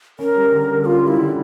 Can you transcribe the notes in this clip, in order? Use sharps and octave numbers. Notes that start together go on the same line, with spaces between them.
C#4 A#4
G3
D3
G4
C#4 F4
G3 E4
D3